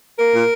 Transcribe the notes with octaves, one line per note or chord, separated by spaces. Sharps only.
A#3 A#4
A#2